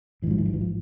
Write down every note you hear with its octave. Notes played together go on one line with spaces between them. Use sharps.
A1 G#2 E3 F3
E3
F3
E3
F3